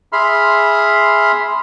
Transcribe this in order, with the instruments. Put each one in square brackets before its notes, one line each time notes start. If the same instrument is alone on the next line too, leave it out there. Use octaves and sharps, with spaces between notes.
[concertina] G#4 E5 B5 C6 F6